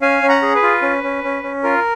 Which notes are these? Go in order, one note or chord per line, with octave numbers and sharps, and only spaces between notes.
C#4 F5 G#5
C#4
F#5 A#5
G#4
B4
F4
C#4
C#4
C#4
C#4
F4 A#4